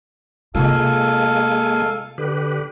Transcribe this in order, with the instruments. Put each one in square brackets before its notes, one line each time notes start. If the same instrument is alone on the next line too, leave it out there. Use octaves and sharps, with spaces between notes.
[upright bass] C3 F4 [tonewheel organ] G#3 A#3 G#5 [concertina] A4 F5
[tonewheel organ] D3 G4 B4